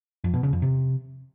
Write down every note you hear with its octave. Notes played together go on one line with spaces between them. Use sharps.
F2
B2
C#3
F2
C3